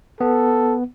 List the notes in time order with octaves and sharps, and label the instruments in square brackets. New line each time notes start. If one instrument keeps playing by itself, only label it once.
[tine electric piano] B3 [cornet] A4